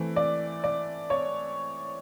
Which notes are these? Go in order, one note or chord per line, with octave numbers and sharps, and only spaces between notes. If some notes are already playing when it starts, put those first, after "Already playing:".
Already playing: E3 A3 C4
D5
D5
C#5